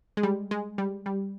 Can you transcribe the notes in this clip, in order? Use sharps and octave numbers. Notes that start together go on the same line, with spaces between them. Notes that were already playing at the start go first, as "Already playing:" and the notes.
G#3
G3
G#3
G3
G3